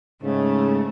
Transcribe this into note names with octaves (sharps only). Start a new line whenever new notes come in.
G#2 C#3 A3